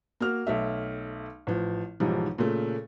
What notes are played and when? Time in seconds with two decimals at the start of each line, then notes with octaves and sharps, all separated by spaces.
0.20 A#3 F#4 F6
0.47 B1 A3 E5
1.47 A1 F3
2.00 B1 G#2 E3 F3 G3
2.38 A#2 C#3 A3